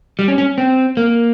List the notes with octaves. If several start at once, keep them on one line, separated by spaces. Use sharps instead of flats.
G3
C#4
C#4
C4
A#3